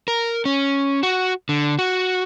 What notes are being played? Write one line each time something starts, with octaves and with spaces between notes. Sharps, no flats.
A#4
C#4
F#4
D3
F#4